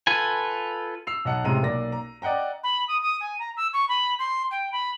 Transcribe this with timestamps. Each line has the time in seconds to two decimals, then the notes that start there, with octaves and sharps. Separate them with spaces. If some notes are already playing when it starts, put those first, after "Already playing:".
0.07 F4 A4 B4 G#5
1.07 E6 C7 F7
1.25 B1 D#5 F#5 A5 C#7
1.44 A1 C3 G#3 A#5 D#7
1.62 B1 A#3 D5 A#6
1.92 A#5
2.22 D5 D#5 F#5 G5 A#5
2.63 B5
2.88 D#6
3.02 D#6
3.20 G#5
3.39 A#5
3.56 E6
3.73 C#6
3.88 B5
4.19 C6
4.51 G5
4.72 B5